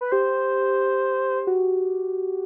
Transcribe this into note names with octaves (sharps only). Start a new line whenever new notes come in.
B4
G4 C5
F#4